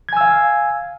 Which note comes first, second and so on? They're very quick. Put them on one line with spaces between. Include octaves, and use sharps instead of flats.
G#6 G#5 E6 F5